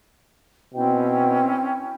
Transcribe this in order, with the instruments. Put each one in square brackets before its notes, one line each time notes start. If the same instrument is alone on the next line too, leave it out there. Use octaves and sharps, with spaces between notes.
[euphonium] B2 [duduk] C4 [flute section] C#4 E4 G5